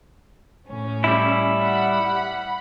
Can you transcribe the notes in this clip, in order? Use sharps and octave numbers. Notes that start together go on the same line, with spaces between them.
A2 C#4
G3 E4
F#5 B5